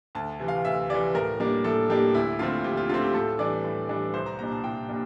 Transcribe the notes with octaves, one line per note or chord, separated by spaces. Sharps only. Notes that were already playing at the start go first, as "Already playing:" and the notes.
D2 A5
C3 E3
F5
D2 E5
C3 E3 D5
A2 A#4
G3 A#3 D4
A2 A4
G3 A#3 D4 G4
D2 E4
D3 A3 C4 F4
D2 G4
F4
D3 A3 C4 F4
G4
A2 A4
E3 G3 D4 D5
A2
E3 G3 D4
C2 C5
A#5
A#2 G3 D4 A#5
A5
C2 G5
A#2 G3 D4